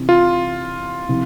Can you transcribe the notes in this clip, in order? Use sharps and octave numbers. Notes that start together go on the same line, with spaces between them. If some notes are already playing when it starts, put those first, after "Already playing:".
Already playing: C3 E3 C4
F4
C3 F3 C4 E4